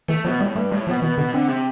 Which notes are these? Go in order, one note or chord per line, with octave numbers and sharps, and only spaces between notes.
E3 A3
B2 F3
A2 G3
G2 A3
A2 G3
B2 F3
B2 E3
B2 D3
D3 C4
C3